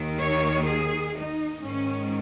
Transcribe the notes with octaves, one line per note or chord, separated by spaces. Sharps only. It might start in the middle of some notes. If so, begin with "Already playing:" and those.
Already playing: D#2 D#3
C#5
G#4
D#4
G#2 D#3 C#4